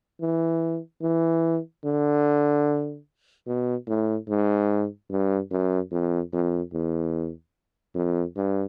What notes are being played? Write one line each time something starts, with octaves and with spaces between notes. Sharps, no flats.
E3
E3
D3
B2
A2
G#2
G2
F#2
F2
F2
E2
F2
G2